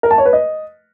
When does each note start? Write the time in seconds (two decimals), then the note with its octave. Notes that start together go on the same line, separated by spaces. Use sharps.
0.03 A#4
0.11 A5
0.18 C#5
0.26 B4
0.33 D#5